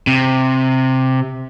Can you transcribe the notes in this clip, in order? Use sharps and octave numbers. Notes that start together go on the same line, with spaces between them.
C3